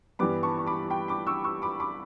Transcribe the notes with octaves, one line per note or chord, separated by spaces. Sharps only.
G2 E3 G3 B3 B5 D6
A5 C#6
C#6
B5 D6
G5 B5
B5 D6
C#6 E6
C#6 E6
B5 D6
B5 D6